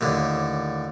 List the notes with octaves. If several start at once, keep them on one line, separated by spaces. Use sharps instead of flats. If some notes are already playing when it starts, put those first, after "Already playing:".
D#2 A2 D3